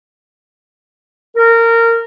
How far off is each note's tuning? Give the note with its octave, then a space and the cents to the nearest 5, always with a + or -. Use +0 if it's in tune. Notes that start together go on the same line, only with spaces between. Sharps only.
A#4 -20